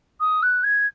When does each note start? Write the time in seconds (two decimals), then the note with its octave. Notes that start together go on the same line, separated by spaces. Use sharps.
0.20 D#6
0.42 F#6
0.63 G#6